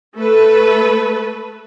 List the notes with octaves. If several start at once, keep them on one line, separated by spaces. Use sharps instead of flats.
A3 A4 B4